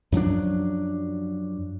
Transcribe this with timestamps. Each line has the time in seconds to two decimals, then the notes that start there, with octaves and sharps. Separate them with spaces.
0.12 F#2 F3 F#3 D4